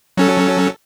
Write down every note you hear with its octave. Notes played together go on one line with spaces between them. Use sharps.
F#3 C#4 A4